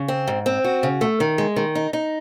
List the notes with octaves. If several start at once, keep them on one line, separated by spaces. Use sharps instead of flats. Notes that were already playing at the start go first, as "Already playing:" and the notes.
Already playing: C#3
C4
G#2
C4
F#4
C#3
A3
D#3
G#3
D#3
D#4
D#4